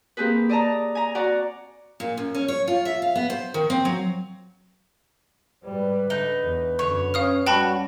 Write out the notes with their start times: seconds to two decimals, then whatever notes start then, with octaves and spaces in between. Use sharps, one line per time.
0.17 A#3 C4 G4 G#4 B4
0.49 D5 D#5 A5 A#5
0.95 G#5 A#5
1.15 F#4 D5 F#5 A#5 C#6
2.00 A#2
2.18 F#2
2.35 C#4
2.48 C#5
2.68 F4
2.85 E5
3.02 F5
3.15 B3
3.30 C5
3.54 D#3
3.70 C4
3.85 F#3
5.64 G#2 G3 B4
6.10 D3 D#4
6.43 E2
6.79 F#2 D3 C#5
7.14 C#4 F5 D#6 F6
7.46 G3 C#4 F#4 G5 A5 B5